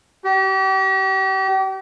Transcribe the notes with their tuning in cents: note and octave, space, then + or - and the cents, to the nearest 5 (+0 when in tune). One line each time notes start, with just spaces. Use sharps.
G4 -40